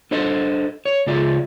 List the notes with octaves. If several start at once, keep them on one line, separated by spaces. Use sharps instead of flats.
D4 A4 C5 D#5
C#5
C#3 G#3 F4 D5 E5